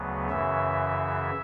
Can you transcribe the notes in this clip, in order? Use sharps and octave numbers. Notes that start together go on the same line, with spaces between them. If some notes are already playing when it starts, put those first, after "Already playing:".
Already playing: D2 C#3 F#3 B3
F#2 C#3 E3 E5